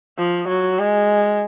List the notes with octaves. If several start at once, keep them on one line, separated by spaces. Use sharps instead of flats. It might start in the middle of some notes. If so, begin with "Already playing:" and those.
F3
F#3
G#3